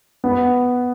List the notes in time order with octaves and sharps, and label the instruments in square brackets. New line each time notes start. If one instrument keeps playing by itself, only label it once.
[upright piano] B3